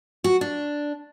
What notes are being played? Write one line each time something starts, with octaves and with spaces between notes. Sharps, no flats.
F#4
D4